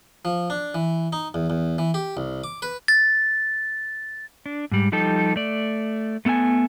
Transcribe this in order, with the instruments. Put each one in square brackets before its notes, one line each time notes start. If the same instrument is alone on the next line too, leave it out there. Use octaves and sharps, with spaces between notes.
[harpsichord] F3
D4
E3
D#4
E2
E2
E3
G4
C2
D6
B4
[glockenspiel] A6
[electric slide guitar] D4
G#2 G3
F3 G3 D#4 G4 A4
A3 D5
A3 B3 A4 F5 G#5